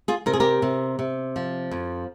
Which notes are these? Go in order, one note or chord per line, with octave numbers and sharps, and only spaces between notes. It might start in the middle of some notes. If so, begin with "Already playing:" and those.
F4 G#4
C3 A#4
G#4
G4 A#4
C3
C3
F3
F2